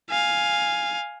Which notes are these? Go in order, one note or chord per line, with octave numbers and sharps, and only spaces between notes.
F5 G#5